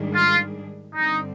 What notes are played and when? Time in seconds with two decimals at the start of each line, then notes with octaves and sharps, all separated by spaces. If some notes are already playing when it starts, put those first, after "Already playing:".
Already playing: G#2 D#3 G3 D4 G#4
0.14 F4
0.94 G2 D3 G3 C4 D#4